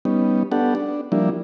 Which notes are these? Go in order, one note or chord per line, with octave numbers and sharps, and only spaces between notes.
G3 B3 C#4 D#4
B3 D4 G4 A4 F#5
D4
F3 G3 A#3 D4 E4